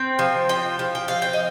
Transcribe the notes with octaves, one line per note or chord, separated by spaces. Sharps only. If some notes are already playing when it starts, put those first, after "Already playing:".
Already playing: C4 G5
F3
F3 G5
F3
G5
C4 F5
G5
D#5